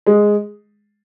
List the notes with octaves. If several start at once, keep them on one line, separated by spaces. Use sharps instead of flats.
G#3